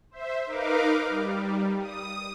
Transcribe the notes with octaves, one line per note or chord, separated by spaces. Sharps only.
C5 E5
D#4 A#4 B4 F5 D6
G3
D#6